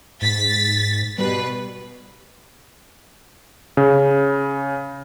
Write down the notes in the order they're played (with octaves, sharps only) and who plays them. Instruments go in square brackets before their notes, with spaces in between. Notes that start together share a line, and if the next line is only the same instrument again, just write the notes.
[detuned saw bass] G#2 [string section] A6 B6
[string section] B2 B4 [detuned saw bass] G3
[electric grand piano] C#3